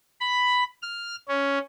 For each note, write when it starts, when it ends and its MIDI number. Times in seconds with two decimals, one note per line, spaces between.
0.20 0.64 83
0.82 1.15 89
1.28 1.59 61